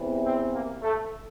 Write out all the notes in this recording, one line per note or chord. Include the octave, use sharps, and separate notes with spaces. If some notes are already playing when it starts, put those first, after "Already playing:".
Already playing: E2 C3 E3
C4
A#3
A3